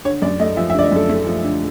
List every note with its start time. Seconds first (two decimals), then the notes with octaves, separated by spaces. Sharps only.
0.05 D3 C#5
0.22 F#2 D5
0.39 A3 D#5
0.57 F3 E5
0.70 E5
0.74 D3 D5
0.83 D#5
0.92 F#2 A4
1.09 A3
1.26 F3
1.44 D3